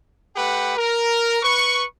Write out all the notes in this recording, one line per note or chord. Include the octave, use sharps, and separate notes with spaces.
A3 G4 B4 F#5 G5
A#4
B4 C#6